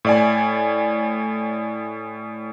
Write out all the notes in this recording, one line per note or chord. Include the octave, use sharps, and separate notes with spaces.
A2 D5 G#5